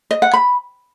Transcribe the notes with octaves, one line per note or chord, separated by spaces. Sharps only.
D#5
F#5
B5